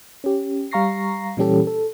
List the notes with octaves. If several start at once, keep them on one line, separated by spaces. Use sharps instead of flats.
C#4 G4
G3 F5 A#5 C#6 A#6 C7
A#2 E3 G3 C#4 G4 A4
A4